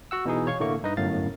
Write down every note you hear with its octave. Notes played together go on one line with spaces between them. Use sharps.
F#4 F#5 E6
B2 E3 D#4 G#4
C#5 F5 C#6
A2 D3 A3 A#3 C#6
G2 D#4 B4 D#5
G1 F#2 A2 F5 A6